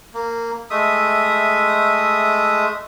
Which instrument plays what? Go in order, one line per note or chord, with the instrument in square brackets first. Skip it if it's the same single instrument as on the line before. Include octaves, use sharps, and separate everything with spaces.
[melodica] A#3
G#3 A3 E5 D#6